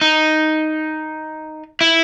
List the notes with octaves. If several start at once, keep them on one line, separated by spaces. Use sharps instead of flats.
D#4
E4